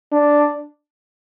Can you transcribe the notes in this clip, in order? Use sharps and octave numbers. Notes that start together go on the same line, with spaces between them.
D4